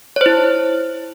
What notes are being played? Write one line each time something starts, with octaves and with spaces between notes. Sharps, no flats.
E4 C5 C#5